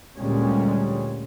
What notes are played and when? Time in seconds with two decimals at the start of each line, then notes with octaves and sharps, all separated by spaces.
0.17 D2 A#2 D3 G3 G#3 C#4